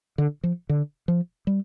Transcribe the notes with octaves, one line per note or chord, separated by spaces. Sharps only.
D3
F3
D3
F3
G3